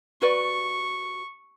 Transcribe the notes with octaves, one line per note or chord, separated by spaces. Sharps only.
F#4 B4 D5 C#6